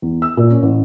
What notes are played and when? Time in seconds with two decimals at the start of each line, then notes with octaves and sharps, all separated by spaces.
0.02 E2
0.22 E6
0.37 A#2
0.50 C#4
0.63 A1